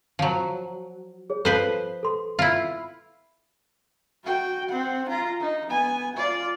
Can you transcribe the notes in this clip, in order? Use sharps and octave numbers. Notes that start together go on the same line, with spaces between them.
F3 F#3
G#4 C#5
F3 A4 B4 C5
A4 C6
E4 F4
F#4 G5
C4 F#5
F4 A#5
D#4
B3 G#5
F4 D5